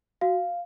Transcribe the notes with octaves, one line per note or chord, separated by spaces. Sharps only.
F#4 F5